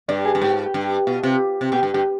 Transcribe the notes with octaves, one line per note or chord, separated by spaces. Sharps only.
G2 D5
G#4
G2
G#2 G4
F4
G4
G2
B2 F4
C3 F4
C3
B2 G4
G2
G2 G4